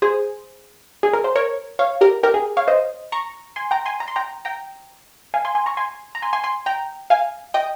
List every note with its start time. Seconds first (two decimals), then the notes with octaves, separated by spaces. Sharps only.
0.02 G#4 C5
1.03 G#4
1.13 A#4
1.24 C5
1.36 A#4 C#5
1.79 C#5 F5
2.01 G4 A#4
2.23 G4 A#4
2.34 G#4
2.57 C#5 F5
2.68 C5 D#5
3.12 A#5 C#6
3.56 G#5 C6
3.71 G5 A#5
3.86 G#5 C6
4.00 A#5
4.08 C6
4.16 G5 A#5
4.45 G5 A#5
5.34 F5 G#5
5.45 G#5 C6
5.55 G#5 C6
5.66 A#5 C#6
5.77 G#5 C6
6.15 A#5
6.22 G#5 C6
6.33 G#5 C6
6.44 G#5 C6
6.66 G5 A#5
7.10 F5 G#5
7.54 D#5 G5